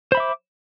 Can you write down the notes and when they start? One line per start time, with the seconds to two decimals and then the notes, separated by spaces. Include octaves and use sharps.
0.12 C5
0.15 B5
0.17 E5
0.20 D6